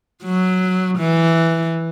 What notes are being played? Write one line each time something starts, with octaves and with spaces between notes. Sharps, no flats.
F#3
E3